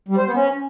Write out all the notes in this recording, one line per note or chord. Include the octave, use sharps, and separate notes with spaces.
G3
C5
B3
C#4